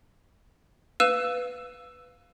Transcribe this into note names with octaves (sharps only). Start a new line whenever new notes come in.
B4 F5 E6 D#7 E7